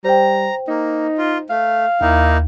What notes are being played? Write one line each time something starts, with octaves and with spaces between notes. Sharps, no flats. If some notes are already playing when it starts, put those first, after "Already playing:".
G3 C5 G5 A#5
A#3 D#4
F4
A3 F5
D#2 A#3 D#4 E4